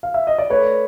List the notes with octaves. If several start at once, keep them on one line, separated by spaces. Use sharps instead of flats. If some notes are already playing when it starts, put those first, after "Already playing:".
F5
E5
D#5
D5
A3 B4 C#5